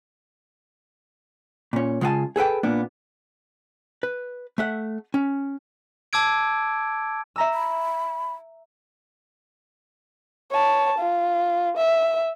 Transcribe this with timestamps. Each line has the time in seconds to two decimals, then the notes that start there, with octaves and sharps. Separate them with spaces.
1.73 A#2 C#4
2.01 C#3 G#3 F4 F#5 G#5 A5
2.36 G#4 A4 B4 G5
2.63 A#2 A#3 B3 D4
4.03 B4
4.58 A3 E5 F#5
5.14 C#4
6.13 A5 D6 E6 G#6 D7
7.36 E5 A#5 E6
7.54 B5
10.51 C#5 A5
10.98 F4
11.77 E5